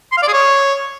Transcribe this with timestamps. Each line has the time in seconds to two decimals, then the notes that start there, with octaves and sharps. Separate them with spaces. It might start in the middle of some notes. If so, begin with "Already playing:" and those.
0.12 C6
0.17 F5
0.23 D5
0.28 G#4
0.33 C#5